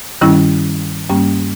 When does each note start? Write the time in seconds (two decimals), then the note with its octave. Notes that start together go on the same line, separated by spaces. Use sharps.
0.21 G2 D#3 G3 C#4 E4
1.10 G2 G3 A#3 C#4